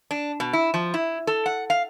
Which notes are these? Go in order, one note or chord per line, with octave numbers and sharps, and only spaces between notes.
D4
B2
E4
F3
E4
A4
F#5
F5